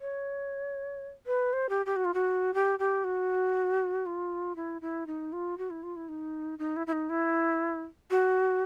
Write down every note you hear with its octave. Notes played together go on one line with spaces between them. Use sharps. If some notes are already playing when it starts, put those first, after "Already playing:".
C#5
B4
C5
G4
G4
F#4
F4
F#4
G4
G4
F#4
F4
E4
E4
D#4
F4
F#4
E4
F4
E4
D#4
D#4
E4
E4
D#4
E4
F#4